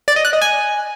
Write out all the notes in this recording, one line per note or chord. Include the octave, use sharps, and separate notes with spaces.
D5
D#5
F#6
D#5
G#5